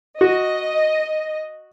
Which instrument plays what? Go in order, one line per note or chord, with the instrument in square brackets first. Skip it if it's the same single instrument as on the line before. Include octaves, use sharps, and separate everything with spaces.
[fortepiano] F#4 [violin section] D#5